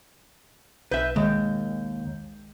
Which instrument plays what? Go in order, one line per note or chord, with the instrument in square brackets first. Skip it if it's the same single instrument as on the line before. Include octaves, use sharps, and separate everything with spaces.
[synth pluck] B1 G6 [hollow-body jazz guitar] B4 E5
[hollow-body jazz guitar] D#2 [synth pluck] D#3 G#3